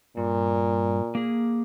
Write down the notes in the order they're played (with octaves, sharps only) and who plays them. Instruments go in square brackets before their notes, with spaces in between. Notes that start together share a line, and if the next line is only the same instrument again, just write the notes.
[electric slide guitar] G2 [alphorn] A#2
[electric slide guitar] A#3 G#4